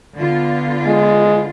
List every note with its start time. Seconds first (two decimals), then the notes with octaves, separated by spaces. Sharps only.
0.17 D3 B3 F4
0.87 G#3